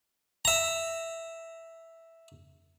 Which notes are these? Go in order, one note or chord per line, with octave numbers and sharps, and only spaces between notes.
E5 A#5